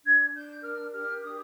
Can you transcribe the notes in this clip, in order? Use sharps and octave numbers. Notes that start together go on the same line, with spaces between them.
D4 G#6
D4 G6
A#4 F6
G4 F6
D4 D#6